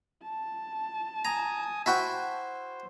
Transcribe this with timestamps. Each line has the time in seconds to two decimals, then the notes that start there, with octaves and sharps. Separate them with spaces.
0.23 A5
1.25 G#5 A#5 D#6
1.86 E4 F#4 C5 G5